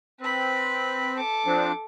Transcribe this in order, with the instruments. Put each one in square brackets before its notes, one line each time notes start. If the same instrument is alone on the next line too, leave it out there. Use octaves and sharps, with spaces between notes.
[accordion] C4 [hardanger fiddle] B4 B5
[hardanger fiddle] A4 D6
[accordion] F3 C4 D4